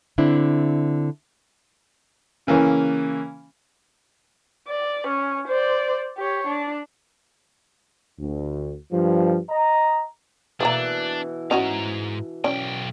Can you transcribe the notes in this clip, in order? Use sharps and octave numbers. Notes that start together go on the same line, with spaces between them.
D3 C4 D4 E4
C#3 E3 A#3 C#4
D5
C#4
C5 D5
G4 C#5
D4
D2
G2 F3
D#5 A#5
B2 E3 A3 A#3 D4 A#5
G#2 C#4 D#4 F#4 A#5
B1 C#4 D5 G5